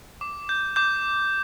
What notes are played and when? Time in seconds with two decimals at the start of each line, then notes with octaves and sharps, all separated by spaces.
0.21 D6
0.49 G6
0.76 D6 G6